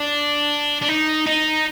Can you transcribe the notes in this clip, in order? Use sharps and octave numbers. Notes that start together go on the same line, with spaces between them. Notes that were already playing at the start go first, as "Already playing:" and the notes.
Already playing: D4
D4
D#4
D#4